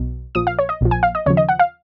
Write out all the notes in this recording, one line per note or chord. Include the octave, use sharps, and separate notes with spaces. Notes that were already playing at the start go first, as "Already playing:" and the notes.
Already playing: B1 B2
A#1 A#2 F3 D#6
F5
C#5
D#5
A#1 A#2 F3
G#5
F5
D#5
D#2 C#3 F3 C#5
D#5
F#5
F5